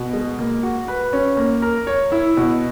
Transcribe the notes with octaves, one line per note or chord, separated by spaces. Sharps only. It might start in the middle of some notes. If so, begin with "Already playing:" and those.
Already playing: B2
G#3
A#3
F#4
B4
C#4
A#3
A#4
C#5
E4
B2